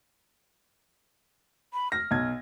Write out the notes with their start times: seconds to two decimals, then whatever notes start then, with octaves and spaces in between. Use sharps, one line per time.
1.73 B5
1.92 F6 A#6
2.11 B1 G#6